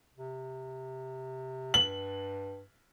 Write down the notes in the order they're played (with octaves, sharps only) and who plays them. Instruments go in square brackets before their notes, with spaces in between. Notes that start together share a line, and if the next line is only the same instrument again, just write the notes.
[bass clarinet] C3
[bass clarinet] G2 [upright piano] F#7